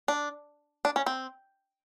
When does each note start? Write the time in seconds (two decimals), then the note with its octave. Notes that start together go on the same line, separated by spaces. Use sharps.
0.08 D4
0.85 D4
0.96 C#4
1.06 C4